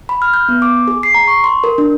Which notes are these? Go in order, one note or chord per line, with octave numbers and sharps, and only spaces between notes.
B5
F6
G6
B3
D6
G#4
C7
A#5
C#6
C6
A#4
D4